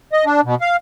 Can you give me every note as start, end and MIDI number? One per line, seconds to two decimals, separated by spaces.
0.13 0.25 75
0.26 0.41 62
0.44 0.55 47
0.61 0.76 77